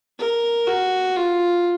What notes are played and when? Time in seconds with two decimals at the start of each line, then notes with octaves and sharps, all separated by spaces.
0.19 A#4
0.67 F#4
1.17 F4